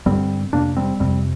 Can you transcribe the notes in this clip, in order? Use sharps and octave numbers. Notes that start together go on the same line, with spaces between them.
G2 D3 G3 C4
F2 C3 A#3 D4
G3 C4
F2 C3 G3 C4